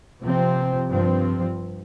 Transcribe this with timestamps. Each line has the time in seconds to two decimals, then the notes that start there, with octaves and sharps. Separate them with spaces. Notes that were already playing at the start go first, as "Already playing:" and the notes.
0.22 C3 F3 C4
0.88 G2 F3 C4